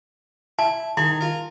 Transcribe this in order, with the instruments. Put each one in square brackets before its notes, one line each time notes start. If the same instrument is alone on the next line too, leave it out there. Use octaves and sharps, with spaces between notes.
[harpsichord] E4 [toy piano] A5
[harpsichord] D#3 G#4 A5 [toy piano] E4
[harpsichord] F4 A#4